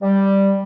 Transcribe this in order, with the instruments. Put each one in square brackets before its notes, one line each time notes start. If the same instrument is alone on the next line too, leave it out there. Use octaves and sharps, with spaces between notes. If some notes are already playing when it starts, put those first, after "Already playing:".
[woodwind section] G3